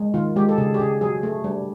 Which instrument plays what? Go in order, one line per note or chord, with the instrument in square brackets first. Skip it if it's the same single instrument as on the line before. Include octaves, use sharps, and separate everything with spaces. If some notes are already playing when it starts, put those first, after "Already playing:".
Already playing: [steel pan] G#3
D#3 F4
G#3 G4
A4
C#3 G#4
G4
C#3 G#4
F#3 G#4
A3
G3